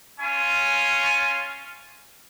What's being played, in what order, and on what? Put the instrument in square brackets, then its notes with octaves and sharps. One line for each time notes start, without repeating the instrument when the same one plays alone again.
[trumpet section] C#4 F4 G#5